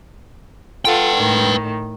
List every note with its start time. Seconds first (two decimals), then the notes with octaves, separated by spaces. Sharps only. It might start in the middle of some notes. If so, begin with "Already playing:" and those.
0.85 F4 A4 B4 F#5 G5
1.16 A2 D#3